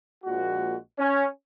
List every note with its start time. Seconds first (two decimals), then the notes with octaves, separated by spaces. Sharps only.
0.24 A#1 A#2 F3 G#3 F#4
0.99 C#4